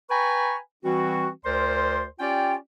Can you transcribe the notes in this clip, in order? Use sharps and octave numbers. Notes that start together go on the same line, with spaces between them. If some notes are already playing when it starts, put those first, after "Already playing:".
B4 G5 G#5 A#5 B5 C#6
E3 G3 C4 F#4
D2 A#4 C5 D5 C6
C#4 F4 G4 D5 G5